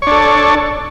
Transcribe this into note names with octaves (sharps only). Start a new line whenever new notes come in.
D4 A4 C#5